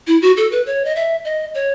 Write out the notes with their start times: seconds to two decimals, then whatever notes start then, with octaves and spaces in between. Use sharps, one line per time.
0.07 E4
0.22 F#4
0.37 A4
0.52 B4
0.66 C#5
0.85 D#5
0.96 E5
1.25 D#5
1.54 C#5